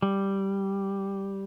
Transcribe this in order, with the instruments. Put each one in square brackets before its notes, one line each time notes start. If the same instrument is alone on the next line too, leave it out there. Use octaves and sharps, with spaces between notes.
[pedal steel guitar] G3